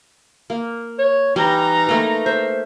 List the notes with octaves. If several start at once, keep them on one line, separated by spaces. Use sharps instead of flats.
A#3
C#5
E3 G3 D#4 A#5
A3 A#3 B4
C5 E5